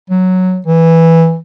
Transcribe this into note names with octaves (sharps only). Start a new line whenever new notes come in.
F#3
E3